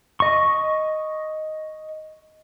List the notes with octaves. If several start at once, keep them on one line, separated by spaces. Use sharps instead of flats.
D#5 C#6